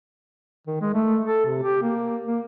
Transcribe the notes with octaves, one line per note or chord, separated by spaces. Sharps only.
D#3
G#3
A3
A4
C3
G4
A#3
A#3